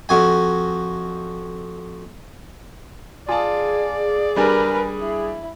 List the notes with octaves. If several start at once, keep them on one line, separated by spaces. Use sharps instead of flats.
F2 F#4 G#5
F4 G#4 D5 A5
G3 D4 A#4 B4 G#5
E4